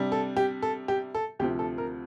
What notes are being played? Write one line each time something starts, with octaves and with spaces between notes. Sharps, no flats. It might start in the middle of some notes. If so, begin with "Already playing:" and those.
Already playing: C3 G3 D4
A4
G4
A4
G4
A4
D2 C3 F3 G4
A4
A#4